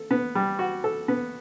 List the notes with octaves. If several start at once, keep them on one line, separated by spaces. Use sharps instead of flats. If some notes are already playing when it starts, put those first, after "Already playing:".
Already playing: A4
B3
G3
F#4
A4
B3